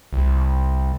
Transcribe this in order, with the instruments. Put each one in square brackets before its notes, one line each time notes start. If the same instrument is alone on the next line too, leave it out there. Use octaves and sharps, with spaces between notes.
[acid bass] C2